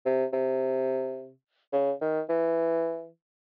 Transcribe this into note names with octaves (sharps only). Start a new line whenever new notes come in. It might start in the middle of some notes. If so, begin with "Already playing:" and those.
C3
C3
C#3
D#3
E3